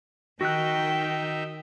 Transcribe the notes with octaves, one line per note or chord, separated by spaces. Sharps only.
D#3 D#4 F#4 E5 G5 F#6